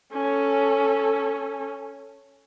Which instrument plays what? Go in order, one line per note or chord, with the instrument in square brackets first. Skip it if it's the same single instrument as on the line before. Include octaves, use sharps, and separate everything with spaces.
[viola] C#4 A4